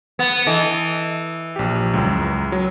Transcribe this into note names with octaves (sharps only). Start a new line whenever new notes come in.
B3
E3 A4 D#5 D7
A#1 G4
C#2 F#2
F#3